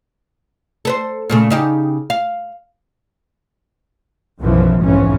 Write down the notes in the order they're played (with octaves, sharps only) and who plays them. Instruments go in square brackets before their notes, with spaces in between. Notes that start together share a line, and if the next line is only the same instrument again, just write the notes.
[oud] A4 B4 C5
A#2 C#3 A3
C#3 D#4 G4
F5
[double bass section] B1 F#2 B2 E3 F3
B1 F2 G#2 E3 C#4